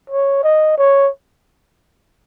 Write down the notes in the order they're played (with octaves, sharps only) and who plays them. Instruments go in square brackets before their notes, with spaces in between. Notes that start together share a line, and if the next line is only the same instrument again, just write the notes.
[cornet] C#5
D#5
C#5